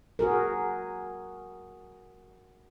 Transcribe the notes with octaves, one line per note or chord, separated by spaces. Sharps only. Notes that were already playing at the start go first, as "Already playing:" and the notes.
F#4 G#4 A#4